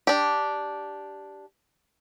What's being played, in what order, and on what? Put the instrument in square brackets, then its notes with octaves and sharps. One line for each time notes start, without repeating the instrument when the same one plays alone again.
[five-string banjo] D4 G4